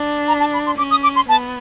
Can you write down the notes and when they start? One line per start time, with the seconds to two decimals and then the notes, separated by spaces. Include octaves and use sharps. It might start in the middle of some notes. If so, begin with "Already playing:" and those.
Already playing: D4
0.28 A#5
0.40 A5
0.53 B5
0.66 C6
0.78 C#4 D6
0.91 D#6
1.03 D6
1.16 C6
1.29 B3 A5